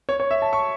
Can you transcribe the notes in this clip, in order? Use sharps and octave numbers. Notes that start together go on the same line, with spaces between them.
C#5
C#5
E5
A5
C#6